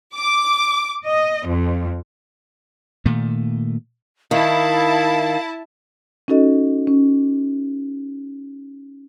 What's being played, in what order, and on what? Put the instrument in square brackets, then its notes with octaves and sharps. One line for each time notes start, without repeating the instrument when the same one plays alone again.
[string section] D6
D#5
F2
[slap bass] A#2 D#3 A3
[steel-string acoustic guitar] D#3 [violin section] E4 A5 [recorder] F5
[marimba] C#4 D#4 F#4 A4 D#5
C#4